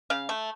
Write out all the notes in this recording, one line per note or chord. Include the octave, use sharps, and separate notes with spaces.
C#3 F5
A3